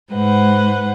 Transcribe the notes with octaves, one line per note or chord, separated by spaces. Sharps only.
G#2 B4 C5 F#5